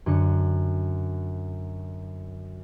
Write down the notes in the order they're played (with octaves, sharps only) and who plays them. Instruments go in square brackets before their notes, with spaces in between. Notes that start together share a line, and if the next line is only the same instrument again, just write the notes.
[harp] F#2 D3 C#7